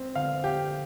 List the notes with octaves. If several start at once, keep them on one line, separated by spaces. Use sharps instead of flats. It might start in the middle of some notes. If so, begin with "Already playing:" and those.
Already playing: C4
D3 F5
G4